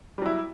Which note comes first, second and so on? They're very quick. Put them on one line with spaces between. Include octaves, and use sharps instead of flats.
G3 F#3 E4